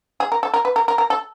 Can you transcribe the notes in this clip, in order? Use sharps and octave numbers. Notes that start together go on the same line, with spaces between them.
G#4
A#4
A4
A#4
B4
A#4
A#4
A#4
A4